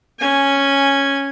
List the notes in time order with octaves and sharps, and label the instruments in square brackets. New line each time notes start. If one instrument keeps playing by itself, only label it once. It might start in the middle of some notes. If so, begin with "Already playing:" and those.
[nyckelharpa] C#4 G#5